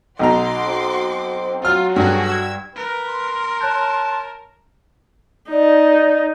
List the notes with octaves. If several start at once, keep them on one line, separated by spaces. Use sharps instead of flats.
B1 B2 F#4 A#5 C6 D6
C4
F#3 F4 F6
G2 F#4 G#4 A4
E6 G#6
A#4 B4
C6
C#5 A5 F#6 G6
D#4 D5